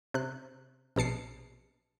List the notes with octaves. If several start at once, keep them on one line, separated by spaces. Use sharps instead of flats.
C3 F#6
A#1 B2 A5 C7 C#7